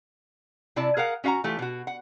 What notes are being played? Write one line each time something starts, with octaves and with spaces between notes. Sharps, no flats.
C3 E4 D5 A5
G#4 A#4 F5 F#5
C#4 F#4 F5 F#5 A#5
E3 A3 F4 G4
B2 F#4
F#5